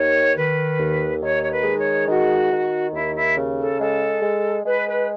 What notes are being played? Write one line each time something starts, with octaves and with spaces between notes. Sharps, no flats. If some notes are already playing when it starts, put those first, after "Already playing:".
Already playing: D#2 D#3 C#5
D#3 B4
D#2
D#3 C#5
C#5
B4
G#3
C#5
D#3 F#4
D#3
D#2 E4
E4
C#3
A4
G#3 A4
G#3
G#3 B4
B4